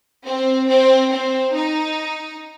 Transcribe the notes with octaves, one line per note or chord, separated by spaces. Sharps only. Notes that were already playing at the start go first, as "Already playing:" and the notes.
C4
C4
C4
D#4